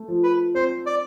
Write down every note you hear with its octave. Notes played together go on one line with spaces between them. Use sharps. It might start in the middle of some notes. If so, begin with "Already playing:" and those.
Already playing: A3
F3
B4
C4 C5
D5